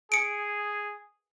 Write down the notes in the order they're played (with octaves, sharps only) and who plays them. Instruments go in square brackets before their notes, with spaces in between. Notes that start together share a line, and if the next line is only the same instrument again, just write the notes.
[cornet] G#4 [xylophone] C#7 D7